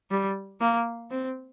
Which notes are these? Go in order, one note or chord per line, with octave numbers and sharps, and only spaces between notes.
G3
A#3
C4